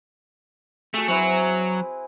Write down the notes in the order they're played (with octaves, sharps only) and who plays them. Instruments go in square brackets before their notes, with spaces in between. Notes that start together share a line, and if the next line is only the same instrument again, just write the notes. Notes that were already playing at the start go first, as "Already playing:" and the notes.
[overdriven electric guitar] A3 [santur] F#4 G#4
[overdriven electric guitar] F#3 [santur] C4 E4 B4